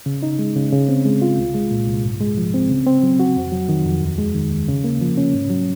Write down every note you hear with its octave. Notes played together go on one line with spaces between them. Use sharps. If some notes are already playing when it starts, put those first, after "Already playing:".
C#3
D#4
G#3
C#3
C#3
C4
G#3
F4
C2
G#3
A#2
C2
G#2
G#3
F3
C4
C#3
C4
F#3
F#4
F2
F#3
D#3
F2
D#2
G#3
D#3
D#2
C#3
A#3
F3
C#4
G#2
F#3